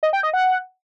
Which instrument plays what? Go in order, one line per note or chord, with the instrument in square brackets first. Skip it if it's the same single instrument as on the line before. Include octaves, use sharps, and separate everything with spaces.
[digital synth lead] D#5
G5
D#5
F#5